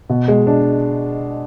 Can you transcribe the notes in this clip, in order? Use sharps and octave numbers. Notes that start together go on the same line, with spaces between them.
B2
G#3
D4